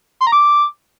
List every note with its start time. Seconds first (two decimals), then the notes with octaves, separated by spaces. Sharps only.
0.21 C6
0.27 A#5
0.32 D6